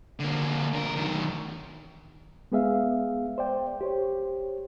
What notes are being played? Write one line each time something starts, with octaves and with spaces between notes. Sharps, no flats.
D3 A#3
D3 A#4
F#2 D#3
G#3 B3 G#4 E5 F5
C5 D5 G5
G4 C5 C#5